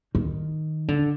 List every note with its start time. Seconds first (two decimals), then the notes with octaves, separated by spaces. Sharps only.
0.15 D#3
0.88 D3